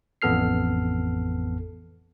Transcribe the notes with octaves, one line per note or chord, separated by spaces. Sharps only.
A1 F2 B3 A4 F6 C7